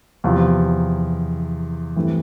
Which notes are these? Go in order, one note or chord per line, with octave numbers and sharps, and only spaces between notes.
E2 C3 F3
G2 E3 A3 C4